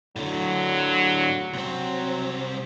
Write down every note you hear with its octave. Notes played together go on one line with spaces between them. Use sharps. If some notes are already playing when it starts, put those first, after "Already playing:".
A2 D3 F#3
C2 F#3 C4